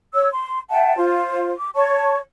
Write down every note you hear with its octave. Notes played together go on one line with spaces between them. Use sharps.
C#5 E6
C6
E5 F#5 G5 A5
F4 C5
D6
C#5 A5 C#6